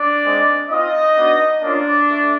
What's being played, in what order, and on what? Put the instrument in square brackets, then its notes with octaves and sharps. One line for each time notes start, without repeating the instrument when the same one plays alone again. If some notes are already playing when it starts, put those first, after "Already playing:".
Already playing: [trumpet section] D4 D5
G#3 C4 D#4
C4 D#4 F4 D#5
B3 D4 F#4
A#3 C#4 D4 F4 D5
A3